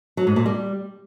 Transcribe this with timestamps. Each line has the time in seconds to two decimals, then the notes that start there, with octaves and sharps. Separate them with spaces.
0.17 F#3
0.27 G#2
0.36 A#2
0.46 G3